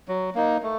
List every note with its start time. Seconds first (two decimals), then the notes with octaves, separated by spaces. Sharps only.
0.08 F#3
0.35 A#3 D#4
0.63 A3